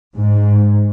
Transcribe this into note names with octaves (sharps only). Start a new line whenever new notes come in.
G#2